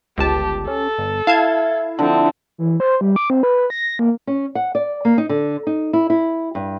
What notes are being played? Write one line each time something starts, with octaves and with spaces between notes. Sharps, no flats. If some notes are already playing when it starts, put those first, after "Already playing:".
G1 C#2 G4 A5
C#4 A4
G1
E4 F5 A5 G#6
D3 F3 C4
E3
C5
G3
D6
C4
B4
A#6
A#3
C#4
F#5
D5
A#3
D#4
D3
D#4
E4
E4
G2